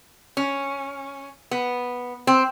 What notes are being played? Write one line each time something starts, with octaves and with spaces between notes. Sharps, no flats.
C#4
B3
C4